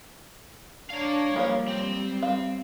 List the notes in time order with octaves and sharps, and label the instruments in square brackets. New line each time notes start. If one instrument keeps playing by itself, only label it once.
[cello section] D4 C#5 [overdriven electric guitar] F5 A#5
[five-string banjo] F3 A#3 C#5 [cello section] G3
[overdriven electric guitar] C4
[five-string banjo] F5